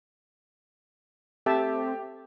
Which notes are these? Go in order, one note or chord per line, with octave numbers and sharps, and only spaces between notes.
A3 C4 G4 E5 A5